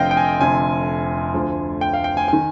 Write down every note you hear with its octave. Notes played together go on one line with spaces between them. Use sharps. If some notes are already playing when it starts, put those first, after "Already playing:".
Already playing: F1 F2 D3 F3 D#5 F5 G5
G5
G#5
F1 F2 D3 G#5
D2 D3 F3
G5
F5
G5
G#5
D#3 G#5